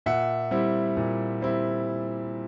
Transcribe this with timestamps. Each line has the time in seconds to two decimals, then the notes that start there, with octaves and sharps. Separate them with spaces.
0.06 A#2 E5 F#5
0.51 G3 C4 E4
0.97 A#2
1.41 G3 C4 E4